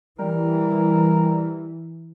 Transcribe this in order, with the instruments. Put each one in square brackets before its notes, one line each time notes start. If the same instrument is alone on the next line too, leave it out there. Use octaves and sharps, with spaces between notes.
[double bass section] E3 [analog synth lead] G3 [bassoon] A#4